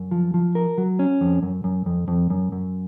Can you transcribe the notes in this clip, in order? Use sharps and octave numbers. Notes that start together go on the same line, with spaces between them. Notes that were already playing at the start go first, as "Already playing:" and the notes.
Already playing: F#2
F3
F3
A#4
F#3
C#4
F2
F#2
F#2
F2
F2
F#2
F#2